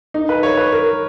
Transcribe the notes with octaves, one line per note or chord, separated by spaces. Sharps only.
D#4
B4
C#5
B4
A#4